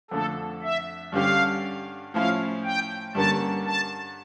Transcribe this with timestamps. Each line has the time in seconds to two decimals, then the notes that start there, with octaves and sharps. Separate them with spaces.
0.11 F2 D3 A3 A4
0.62 E5
1.12 G2 D3 G3 C#4 G4 F5
2.14 A2 F3 C#4 E4 F5
2.64 G5
3.15 G2 D3 G3 A#3 C#4 A5
3.66 A5